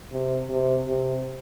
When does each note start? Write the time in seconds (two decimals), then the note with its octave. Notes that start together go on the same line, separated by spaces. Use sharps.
0.11 C3
0.49 C3
0.87 C3